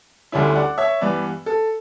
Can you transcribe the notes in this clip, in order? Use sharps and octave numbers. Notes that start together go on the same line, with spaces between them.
D2 D3 G3 C#4 E4
D5 F#5
C#5 E5
G2 E3 B3 B4 D5
A4